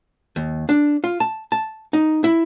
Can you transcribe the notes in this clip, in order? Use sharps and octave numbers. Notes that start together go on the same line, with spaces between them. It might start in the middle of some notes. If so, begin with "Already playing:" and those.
D#2
D4
F4
A5
A5
D#4
E4